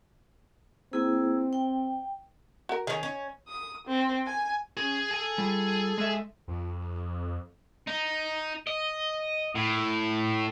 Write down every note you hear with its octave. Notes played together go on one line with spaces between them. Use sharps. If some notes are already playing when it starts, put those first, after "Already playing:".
A#3 C4 E4 G#4
G5
F#4 A#4
D#3 C#4 G#4 D#5
C#4
D#6
C4
G#5
C#4 G#4
G#4 A4 G#5
G3 F4
G#3 E5
F2
D#4
D#5
A2